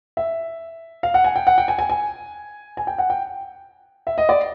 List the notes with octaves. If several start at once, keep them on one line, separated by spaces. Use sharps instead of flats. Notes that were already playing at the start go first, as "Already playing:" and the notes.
E5
F5
F#5
G#5
G5
F#5
G5
G#5
G#5
G#5
G#5
G5
F#5
G5
E5
D#5
D5